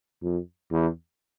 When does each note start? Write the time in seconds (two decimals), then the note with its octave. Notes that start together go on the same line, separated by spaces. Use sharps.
0.22 F2
0.71 E2